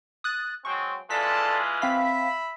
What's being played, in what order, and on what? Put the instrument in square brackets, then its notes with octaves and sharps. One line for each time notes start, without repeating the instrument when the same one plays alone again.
[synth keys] D#6 F#6 A6
[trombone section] F#3 G#3 C4 [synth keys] C#6
[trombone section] E3 G#3 F4 [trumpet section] A4 D5 A5 [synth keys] B6
[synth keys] C4 F5 B6 [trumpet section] E5 B5